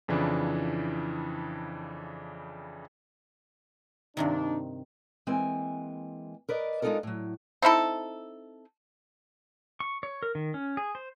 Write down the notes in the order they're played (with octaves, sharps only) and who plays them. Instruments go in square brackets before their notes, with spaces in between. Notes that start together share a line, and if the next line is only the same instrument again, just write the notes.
[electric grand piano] F2 C#3 E3 D4 E4 F4
[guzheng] G2 C3 D#3 [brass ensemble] D4 D#4
[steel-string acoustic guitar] E3 G#3 A#3 C4 G#5
A#4 B4 D5 D#5
G#3 D4 D#4 F4 A4 A#4
A2 F#3
[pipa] C4 D#4 E4 A4
[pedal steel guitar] C#6
C#5
A#4
D#3
C#4
G#4
C5